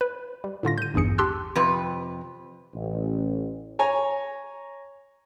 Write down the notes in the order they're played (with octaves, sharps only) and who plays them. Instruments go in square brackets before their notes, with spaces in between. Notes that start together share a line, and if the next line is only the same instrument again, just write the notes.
[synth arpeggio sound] B4
G3
A2 D3 F4 A#6
G6 D#7
A1 E2 G2 G#4 C#7
G4 A5 C6 E6 F#6
[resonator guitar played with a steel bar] F2 C3 B4
[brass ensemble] A1
[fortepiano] C#5 G#5 A#5